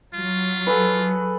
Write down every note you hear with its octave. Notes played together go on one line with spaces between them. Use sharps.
F#3 F4
G#4 A4 B4